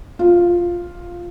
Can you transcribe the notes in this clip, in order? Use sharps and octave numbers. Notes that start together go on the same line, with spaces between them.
F4